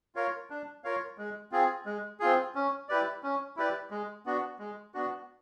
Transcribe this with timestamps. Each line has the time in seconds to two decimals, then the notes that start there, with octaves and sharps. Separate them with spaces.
0.15 F4 A#4 C#5 F5
0.50 D4
0.84 F4 A#4 C#5 F5
1.18 G#3
1.52 C4 F4 G#4
1.86 G#3
2.20 C4 F4 G#4
2.55 C#4
2.89 E4 G4 B4 D5
3.23 C#4
3.56 E4 G4 B4 D5
3.91 G#3
4.26 B3 D4 F#4
4.59 G#3
4.94 B3 D4 F#4